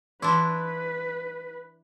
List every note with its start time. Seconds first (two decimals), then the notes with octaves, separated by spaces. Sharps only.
0.22 E3 D4 E4 B4 C6